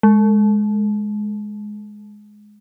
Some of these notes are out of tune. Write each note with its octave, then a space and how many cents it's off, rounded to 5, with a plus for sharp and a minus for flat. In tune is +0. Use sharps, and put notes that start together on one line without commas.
G#3 +10